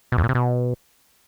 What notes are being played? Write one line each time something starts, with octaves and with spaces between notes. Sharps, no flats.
B2
E2
A#2
C3
B2